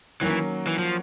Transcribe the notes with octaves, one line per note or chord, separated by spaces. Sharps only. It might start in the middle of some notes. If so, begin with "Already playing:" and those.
D#3 E3 F#3 A#3 C#4
E3
F3